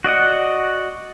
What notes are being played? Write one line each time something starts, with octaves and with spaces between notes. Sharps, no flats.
F#4 D5 D#5 F#5